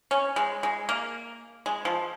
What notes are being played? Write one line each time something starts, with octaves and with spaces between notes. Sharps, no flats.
C#4
G#3
G#3
A#3
G#3
F3